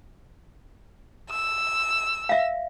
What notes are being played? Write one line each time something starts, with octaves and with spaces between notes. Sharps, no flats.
E6
E5 F5